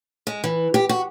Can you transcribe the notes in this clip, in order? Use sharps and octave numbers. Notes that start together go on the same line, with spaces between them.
G#3
E3
G4
F#4